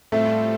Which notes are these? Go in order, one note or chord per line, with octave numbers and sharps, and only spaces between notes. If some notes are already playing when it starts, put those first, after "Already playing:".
A2 G3 A3 C4 F4 A4